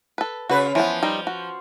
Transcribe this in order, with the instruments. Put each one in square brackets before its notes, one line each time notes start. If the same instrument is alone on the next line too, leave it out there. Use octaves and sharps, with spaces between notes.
[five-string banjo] A4 B4
[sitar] C#3 B4 [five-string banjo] F#4
[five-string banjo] E3 B3 [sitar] F3
[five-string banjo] G3 D#4
F#4